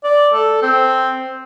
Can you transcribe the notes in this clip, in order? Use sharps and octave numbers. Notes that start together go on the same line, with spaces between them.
D5
A4
C4